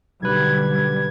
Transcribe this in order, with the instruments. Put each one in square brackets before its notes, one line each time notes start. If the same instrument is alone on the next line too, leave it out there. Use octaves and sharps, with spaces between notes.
[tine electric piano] B1 B4 [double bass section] D3 G3 [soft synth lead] G#6